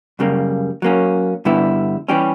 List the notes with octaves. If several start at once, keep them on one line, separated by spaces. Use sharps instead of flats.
F#2 C#3 G3 A#3
F#3 A#3 C#4
G2 D3 G3 B3 E4
E3 G3 C#4 G4